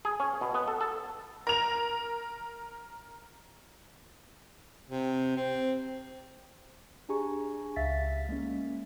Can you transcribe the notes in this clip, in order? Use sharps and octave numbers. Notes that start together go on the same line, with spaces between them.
G#4
C#4
B2
B3
A4
A4
A#4 F7
C3
C4
D4 G4 G#4 G#5 A#5 C#6
C#2 E5 F5 A6 B6
G#3 A#3 C#4